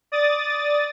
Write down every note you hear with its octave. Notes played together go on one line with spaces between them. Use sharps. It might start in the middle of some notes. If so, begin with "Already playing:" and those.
D5 D#6 A6